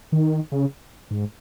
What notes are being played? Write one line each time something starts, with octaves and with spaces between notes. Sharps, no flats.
D#3
C#3
G#2